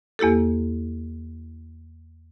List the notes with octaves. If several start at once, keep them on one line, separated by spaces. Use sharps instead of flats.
E2 A#3 E4 G4 A4